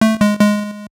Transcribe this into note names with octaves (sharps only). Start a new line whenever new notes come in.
A3
G#3
G#3